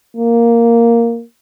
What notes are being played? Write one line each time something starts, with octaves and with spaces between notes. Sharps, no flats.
A#3